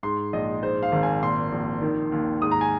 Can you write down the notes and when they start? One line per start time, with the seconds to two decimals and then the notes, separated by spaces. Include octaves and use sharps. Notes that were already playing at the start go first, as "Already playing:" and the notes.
0.03 G#2 C6
0.33 A#1 D#5
0.62 G#2 C5
0.83 F5
0.92 G#1
1.03 G#5
1.23 A#2 C6
1.52 A#1
1.82 D#3
2.12 D#2
2.42 G#2 D#6
2.51 A#5
2.61 G#5